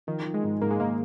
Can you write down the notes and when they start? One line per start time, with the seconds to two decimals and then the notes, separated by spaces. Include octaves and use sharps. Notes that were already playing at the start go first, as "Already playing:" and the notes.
0.07 D#3 F3
0.25 F3
0.34 G#3
0.43 G#2
0.61 G#2 A#3
0.71 G#3
0.80 G#2 A#3